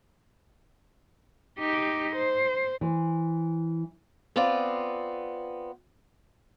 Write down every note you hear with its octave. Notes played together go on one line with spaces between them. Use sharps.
D#4 G4
C5
E3 C5
B3 C4 F4 D5